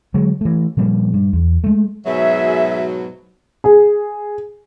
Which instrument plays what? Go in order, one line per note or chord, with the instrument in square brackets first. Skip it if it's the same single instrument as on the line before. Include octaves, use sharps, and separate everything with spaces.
[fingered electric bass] D3 F#3 G#3
E3 A3
A#2 F3 G3 A#3
G2 G3
E2
G#3 A3
[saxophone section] G#2 B2 F#3 [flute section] G#4 E5
[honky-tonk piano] G#4